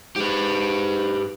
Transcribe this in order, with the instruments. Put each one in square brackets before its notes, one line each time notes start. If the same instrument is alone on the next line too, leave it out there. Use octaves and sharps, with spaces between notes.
[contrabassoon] G#2 [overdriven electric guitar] G4 B4